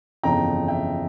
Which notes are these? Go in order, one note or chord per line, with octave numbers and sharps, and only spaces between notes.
G1 F2 C#3 E3 G5 A#5
E5 G5